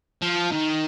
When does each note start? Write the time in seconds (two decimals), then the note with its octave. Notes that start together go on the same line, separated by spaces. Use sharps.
0.22 F3
0.52 D#3